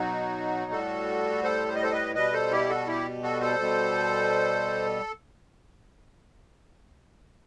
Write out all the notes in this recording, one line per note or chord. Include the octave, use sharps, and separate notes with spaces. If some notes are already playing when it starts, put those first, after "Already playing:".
Already playing: B2 F#3 D#4 F#4
A2 G3 F#4 A4
A4 C5
C5
D#5
A4 C5
B4 D#5
B2 G3 B4 D#5
A4 C5
E4 G4
F#4 A4
E4 G4
F#4 A4
A4 C5
B2 G3